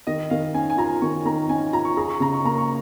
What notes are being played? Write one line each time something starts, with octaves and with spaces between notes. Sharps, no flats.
D#3 D#5
D#3 F5
C#4 G#5
G#5
F4 A#5
D#3 C#6
D#3 A#5
C#4 G#5
F4 A#5
C#6
G#4 A#5
C#6
C#3 A#5
C#6
A#3 A#5
C#6